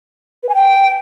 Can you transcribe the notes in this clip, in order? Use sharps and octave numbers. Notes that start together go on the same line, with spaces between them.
B4
G#5
G5